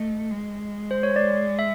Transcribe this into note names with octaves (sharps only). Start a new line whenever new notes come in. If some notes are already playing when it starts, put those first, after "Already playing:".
Already playing: A3 D#5
G#3
C5
C#5
D5
E5